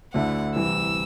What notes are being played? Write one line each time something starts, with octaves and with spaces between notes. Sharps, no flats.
D2 D3 A3 E4 F#5
C2 C3 E3 E6